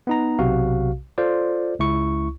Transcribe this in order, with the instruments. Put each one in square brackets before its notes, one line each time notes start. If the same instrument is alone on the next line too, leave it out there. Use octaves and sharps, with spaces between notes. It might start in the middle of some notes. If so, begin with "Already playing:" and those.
[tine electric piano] B3 D#4 A#5
B1 C3 F#4 F5
F4 A4 C5 D5
C#2 E4 C#6